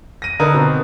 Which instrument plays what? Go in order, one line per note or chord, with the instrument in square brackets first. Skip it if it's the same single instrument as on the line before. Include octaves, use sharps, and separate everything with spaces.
[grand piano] A#6 D#7
[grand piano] D3 [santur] D#4 A#4 B4
[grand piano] B2 C4